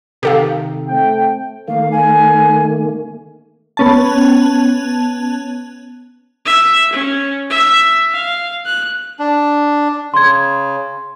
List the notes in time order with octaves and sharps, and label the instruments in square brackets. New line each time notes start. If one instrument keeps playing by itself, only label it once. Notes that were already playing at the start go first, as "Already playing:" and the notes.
[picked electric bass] C3 D#3 [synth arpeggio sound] G4 A4 F5
[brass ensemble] A3 C4 G5
[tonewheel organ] D#3 A3 A#3 [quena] F5
[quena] G#5
[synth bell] B3 C#4 A5
[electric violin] E5
C#4
E5
F5
F#6
[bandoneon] D4
[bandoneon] C#3 [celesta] C6 G#6